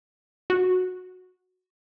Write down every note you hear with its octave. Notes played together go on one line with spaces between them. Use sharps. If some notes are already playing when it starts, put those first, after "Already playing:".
F#4